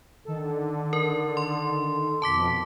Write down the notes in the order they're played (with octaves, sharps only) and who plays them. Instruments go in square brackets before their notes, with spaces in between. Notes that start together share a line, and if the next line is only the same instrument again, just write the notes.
[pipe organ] D3 [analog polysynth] D#3 A4
[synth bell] A#4
C6
[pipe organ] F2 B2 [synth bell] A5 D6 B6